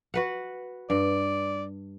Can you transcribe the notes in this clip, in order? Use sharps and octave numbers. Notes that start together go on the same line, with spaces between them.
F#4 B4 F#5
G2 D5